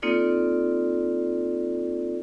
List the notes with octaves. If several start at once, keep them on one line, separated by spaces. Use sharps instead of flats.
A#3 C4 D#4 F4 A4 D5